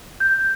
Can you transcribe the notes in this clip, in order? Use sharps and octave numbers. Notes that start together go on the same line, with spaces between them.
G6